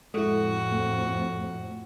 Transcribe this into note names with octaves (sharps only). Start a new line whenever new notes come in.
F2 A2 G#3 E4 F#4 A4
A3